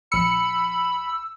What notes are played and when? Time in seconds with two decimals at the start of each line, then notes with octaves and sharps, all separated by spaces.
0.12 A#1 B5 E6 C#7